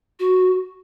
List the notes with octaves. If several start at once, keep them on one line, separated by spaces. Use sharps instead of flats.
F#4